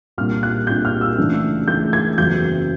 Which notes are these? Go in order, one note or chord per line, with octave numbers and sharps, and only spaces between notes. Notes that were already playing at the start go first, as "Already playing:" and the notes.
C2 A#2 G3 A#3 D4 F6
F#6
C2 A#2 G3 A#3 D4 G6
F6
E6
C#2 C#3 E3 A3 D4
C#2 C#3 E3 A3 D4 G6
G#6
F#1 E2 C#3 F#3 G6